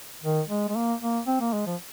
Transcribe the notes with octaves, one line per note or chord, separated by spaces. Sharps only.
D#3
G#3
G#3
A#3
A#3
C4
A#3
G#3
F3